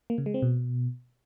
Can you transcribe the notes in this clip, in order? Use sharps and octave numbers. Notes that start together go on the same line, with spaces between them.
A#3
C#3
G#3
C4
B2